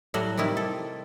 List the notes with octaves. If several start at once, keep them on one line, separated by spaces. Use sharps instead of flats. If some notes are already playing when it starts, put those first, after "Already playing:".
A2 F#3 G3 F#4
C3 D#3 G3 E4
A4